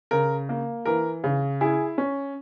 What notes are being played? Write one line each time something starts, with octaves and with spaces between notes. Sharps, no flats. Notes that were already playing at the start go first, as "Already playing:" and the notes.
C#3 A#4
A#3
E3 A#4
C#3
E4 G#4
C#4